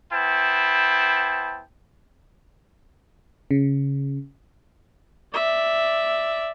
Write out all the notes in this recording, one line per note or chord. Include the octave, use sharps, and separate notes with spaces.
B3 E4 C5 G5 A5
C#3
D5 E5